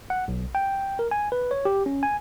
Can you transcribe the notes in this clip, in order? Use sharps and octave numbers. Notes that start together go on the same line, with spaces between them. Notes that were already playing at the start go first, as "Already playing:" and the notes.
F#5
B1
G5
A#4
G#5
B4
C#5
G4
C#4
G#5